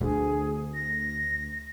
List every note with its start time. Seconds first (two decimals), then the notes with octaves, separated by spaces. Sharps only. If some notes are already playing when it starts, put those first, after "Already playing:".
0.01 D2 D3 C4 G#4
0.74 A#6